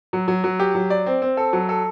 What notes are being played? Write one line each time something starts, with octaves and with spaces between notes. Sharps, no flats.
F#3
F#3
F#3
G4
F#3
D5
C4
C4
A4
F#3
A4